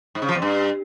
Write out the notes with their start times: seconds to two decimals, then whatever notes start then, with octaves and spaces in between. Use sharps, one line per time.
0.15 G#2
0.22 C#3
0.29 F3
0.35 E2
0.42 G2